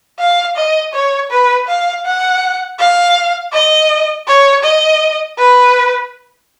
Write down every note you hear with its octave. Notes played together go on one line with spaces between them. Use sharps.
F5
D#5
C#5
B4
F5
F#5
F5
D#5
C#5
D#5
B4